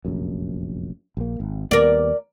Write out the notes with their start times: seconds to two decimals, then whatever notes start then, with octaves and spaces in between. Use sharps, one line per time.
0.05 F1 A#1 F#2
1.17 A#1 A#3
1.40 G#1
1.71 D#2 G3 B3 A#4 D5